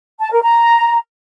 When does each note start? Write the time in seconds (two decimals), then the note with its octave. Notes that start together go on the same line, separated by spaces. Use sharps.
0.20 A5
0.31 A#4
0.43 A#5